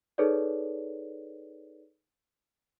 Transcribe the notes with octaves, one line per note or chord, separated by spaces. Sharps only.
D#4 G#4 A4 B4 C#5 D5